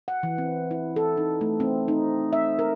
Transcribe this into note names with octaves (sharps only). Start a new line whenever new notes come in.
F#5
E3
C4
E4
A4
D#4
A3
C4
D#4
E5
A#4